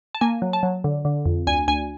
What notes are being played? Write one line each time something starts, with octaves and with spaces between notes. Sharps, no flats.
A5
A#3 G#5
F#3
A5
F#3
D3
D3
F2
D2 G#5
D2 G#5